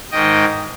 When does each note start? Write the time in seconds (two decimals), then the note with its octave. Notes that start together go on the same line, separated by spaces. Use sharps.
0.12 G#2 D#3 D#5 G5